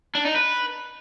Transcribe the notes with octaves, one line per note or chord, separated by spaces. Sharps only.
D4
D#4
B4